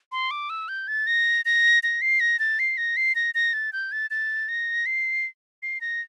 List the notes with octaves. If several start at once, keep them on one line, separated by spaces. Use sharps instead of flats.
C6
D6
E6
G6
A6
A#6
A#6
A#6
C7
A#6
A6
C7
A#6
C7
A#6
A#6
A6
G6
A6
A6
A#6
C7
C7
A#6